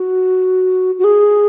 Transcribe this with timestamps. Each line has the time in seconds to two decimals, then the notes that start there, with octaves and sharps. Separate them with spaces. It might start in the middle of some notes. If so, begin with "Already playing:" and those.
Already playing: F#4
0.98 F#4
1.04 G#4